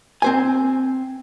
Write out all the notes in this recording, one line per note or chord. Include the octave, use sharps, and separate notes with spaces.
C4 C5 G#5